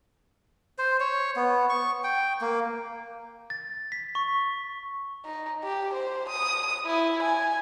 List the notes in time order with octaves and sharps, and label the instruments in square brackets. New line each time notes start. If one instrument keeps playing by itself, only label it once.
[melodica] C5
C#5
B3
C#6
G5
A#3
[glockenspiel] A6
B6
C#6
[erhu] D#4
G4
C5
D#6
E4
G#5